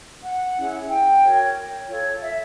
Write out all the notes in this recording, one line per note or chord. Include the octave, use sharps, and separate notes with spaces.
F#5
C#4 E4 G#4
G5
F#4 A#4 C#5
F4 A4 C#5
E5